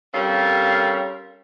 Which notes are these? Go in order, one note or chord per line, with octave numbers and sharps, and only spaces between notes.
G3 C4 C#4 A4 A#4 F5